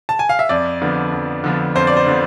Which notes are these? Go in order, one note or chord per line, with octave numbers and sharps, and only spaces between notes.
A5
G#5
F5
E5
F2 D5
D3 F3 B3
F2
D3 F3 B3
F2 C5
D5
C5
D3 F3 B3